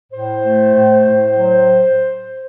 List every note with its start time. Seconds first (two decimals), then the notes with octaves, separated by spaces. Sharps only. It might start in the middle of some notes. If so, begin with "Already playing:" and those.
0.11 A2 C5
0.43 A3
0.74 A2
1.05 A2
1.37 F#3